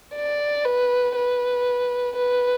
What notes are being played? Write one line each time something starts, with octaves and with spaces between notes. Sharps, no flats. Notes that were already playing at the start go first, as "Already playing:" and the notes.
D5
B4
B4
B4